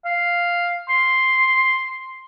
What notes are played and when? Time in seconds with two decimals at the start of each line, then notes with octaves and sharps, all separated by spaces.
0.05 F5
0.89 C6